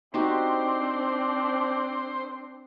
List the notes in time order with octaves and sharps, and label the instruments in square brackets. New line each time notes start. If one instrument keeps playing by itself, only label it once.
[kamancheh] C4 D4 [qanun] D#4 F#4 G4 [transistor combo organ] C5